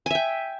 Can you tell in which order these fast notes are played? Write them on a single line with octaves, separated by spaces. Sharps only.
G#5 E5 G5